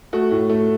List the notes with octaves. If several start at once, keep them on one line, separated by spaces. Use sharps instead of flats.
A3 F#4
A2
A3